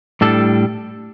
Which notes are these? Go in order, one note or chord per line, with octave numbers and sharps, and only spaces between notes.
A2 G3 D4 A4